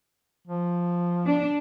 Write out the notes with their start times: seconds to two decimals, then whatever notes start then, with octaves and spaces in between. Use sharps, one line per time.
0.47 F3
1.26 D4